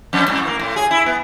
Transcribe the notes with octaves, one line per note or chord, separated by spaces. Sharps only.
F2
G#2
A#3
A2
G#4
E4
B3